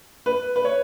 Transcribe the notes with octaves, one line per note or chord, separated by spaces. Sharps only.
B4
B4
C#5